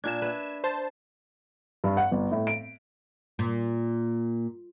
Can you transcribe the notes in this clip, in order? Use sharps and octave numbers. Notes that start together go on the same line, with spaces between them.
A#2 D4 G#6 E7
B4 E5
C5 A5
G2
F#5
G1
A2
D7
A#2